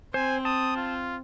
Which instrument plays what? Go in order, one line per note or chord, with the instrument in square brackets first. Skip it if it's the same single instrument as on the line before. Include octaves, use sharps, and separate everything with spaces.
[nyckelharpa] C4 [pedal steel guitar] C5 [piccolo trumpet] G#5
[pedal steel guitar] A5 [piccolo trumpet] D#6
[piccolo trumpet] F4